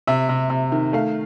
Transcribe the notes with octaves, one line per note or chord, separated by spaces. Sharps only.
C3 E5
C3
C3
D#3
A3 F5